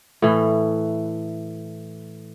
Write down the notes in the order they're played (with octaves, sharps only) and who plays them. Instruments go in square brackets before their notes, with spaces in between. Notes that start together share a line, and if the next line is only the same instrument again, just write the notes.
[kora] A2 E3